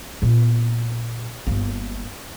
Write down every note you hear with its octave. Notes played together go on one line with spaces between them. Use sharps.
A#2 B3
G1 A#3